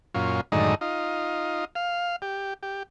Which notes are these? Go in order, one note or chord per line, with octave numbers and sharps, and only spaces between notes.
F#2 A#2 C#4 F4
F#2 A2 D3 D#3 G#3 D#4
D#4 F4
F5
G4
G4